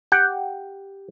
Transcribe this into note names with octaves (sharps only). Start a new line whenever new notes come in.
G4 F#5 G5